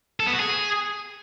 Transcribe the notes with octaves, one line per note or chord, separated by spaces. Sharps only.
A4
B3
F#4
G#4